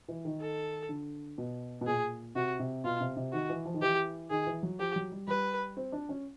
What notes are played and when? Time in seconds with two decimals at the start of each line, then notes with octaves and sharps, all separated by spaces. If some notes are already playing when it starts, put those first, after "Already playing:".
0.08 E3
0.25 D#3
0.41 A4
0.89 D3
1.38 B2
1.81 B2
1.87 A#2 G#4
2.35 C3 F#4
2.59 C3
2.84 B2 F4
3.01 C3
3.17 C3
3.33 D#3 F#4
3.49 E3
3.65 F3
3.74 D#3
3.82 E3 G4
4.30 D#3 G#4
4.47 E3
4.63 F#3
4.79 F3 G4
4.96 F#3
5.12 G3
5.27 G3 B4
5.77 C4
5.92 D4
6.09 C#4